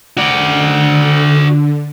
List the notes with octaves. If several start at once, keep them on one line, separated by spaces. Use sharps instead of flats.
D3 F#4 D5